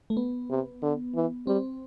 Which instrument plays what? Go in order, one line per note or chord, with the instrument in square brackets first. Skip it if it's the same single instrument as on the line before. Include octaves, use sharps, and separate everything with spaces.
[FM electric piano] A3
B3
[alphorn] C3
D3
E3
[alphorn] G3 [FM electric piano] C4